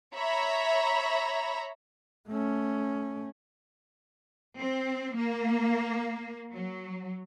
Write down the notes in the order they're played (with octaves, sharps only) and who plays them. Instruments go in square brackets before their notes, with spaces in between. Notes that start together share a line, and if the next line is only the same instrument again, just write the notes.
[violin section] C#5 E5 A#5 B5
[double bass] A3 C#4
[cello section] C4
A#3
F#3